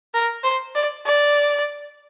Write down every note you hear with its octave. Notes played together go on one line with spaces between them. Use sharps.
A#4
C5
D5
D5